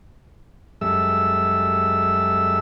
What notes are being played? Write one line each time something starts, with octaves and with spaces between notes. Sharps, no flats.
F#2 G3 G#3 A4 E5 E6